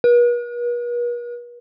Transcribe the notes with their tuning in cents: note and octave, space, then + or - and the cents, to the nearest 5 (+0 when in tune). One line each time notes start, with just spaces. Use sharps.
B4 -45